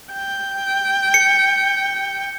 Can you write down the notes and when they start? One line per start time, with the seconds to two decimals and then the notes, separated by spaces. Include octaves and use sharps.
0.13 G5
1.14 C#7